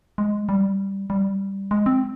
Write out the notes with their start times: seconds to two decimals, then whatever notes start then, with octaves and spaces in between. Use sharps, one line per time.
0.18 G#3
0.49 G3
1.10 G3
1.71 G#3
1.86 C4